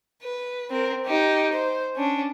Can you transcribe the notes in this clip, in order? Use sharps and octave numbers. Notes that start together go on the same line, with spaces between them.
B4
C4 A#4
D#4 G4
C5
C#4 D4